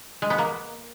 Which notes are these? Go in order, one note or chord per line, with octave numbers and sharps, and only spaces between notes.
G#3
B3
A#3